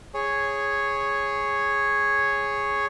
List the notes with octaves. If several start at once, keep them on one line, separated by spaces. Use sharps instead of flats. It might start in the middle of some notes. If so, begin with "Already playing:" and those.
G#4 C#5